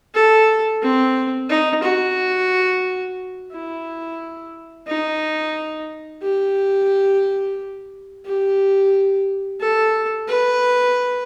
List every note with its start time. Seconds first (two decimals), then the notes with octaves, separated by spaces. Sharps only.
0.14 A4
0.82 C4
1.50 D#4
1.83 F#4
3.52 E4
4.87 D#4
6.22 G4
8.25 G4
9.60 A4
10.28 B4